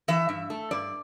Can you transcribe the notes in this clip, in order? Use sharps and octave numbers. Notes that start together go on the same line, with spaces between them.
E3 E5
G2
A3
G2 D5